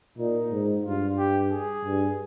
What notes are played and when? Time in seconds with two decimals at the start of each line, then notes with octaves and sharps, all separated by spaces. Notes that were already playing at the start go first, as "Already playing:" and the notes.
0.18 A#2 D#4
0.52 G#2
0.85 G2 F4
1.18 G4
1.51 G#4
1.85 G2